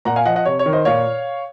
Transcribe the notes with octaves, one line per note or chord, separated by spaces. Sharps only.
A#2 F#5 A#5
F5 G#5
F3 D#5 F#5
D#5 F#5
C3 C#5
C#5
D#3
C5 D#5
A#2 C#5 F5